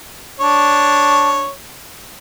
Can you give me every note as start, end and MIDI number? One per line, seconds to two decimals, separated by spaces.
0.40 1.50 62
0.40 1.50 73